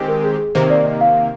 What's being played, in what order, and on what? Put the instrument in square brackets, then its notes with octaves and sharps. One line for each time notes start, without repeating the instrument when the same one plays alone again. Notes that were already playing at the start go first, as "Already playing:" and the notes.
Already playing: [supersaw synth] D#3 G#3 C4 G4
[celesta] A#4
G#4
G#4
[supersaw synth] C3 D#3 A#3 [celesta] C5
[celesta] D5
D#5
F5